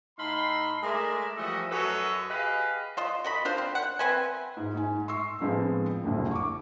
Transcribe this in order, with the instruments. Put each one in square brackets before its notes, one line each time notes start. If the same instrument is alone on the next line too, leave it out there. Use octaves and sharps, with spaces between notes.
[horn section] A2 D#4 F5 B5 C6
G#3 A3 G#4 A#4 D5 E5
E3 F3 G3 A3 F#4 D#5
F#2 F#4 A4 B4 C#5 D#5
G4 G#4 B4 D#5 F5
[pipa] F4 C5 D#5
F#4 D#5 B5
D4 F4 C5
C4
F#5
C4 B4 E5 G#5
[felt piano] G#2
G#2 G#5
C6 C#6 E6 C7
A2 D3 F3 G#3 B3 C4
F#1 C2 F2 D3
C#6 D6